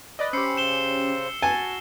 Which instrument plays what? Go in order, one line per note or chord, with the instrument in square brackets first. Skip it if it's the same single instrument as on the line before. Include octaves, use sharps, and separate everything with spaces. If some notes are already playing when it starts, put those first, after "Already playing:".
[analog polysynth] B4 D5 D#5
[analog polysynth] C#4 G4 [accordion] C5 B5 [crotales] E6 C7 C#7
[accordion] C#3 C5 [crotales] E7 G7
[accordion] F#4 [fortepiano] G#5 [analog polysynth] A5